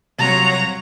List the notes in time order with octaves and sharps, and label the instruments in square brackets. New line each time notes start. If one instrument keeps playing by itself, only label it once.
[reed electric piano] C3 G3 C4 [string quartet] F#3 F4 F#4 [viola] C#5 A#5